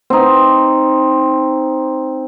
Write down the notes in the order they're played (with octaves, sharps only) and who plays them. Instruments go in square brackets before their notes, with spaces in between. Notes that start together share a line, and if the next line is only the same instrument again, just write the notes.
[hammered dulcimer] C4 D#4